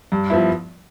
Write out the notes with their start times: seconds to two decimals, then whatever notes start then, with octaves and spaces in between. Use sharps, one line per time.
0.12 G2
0.30 F3 B3 E4